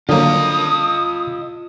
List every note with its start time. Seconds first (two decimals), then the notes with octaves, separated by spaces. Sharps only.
0.09 D3 F#3 A#3 F4 D#5 D#6